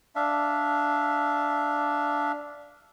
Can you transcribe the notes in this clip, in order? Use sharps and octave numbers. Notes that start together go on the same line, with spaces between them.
D4 E5 F5